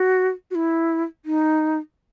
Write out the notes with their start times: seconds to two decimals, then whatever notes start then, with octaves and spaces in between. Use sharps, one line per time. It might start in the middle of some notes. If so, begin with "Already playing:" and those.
Already playing: F#4
0.51 F#4
0.55 E4
1.25 D#4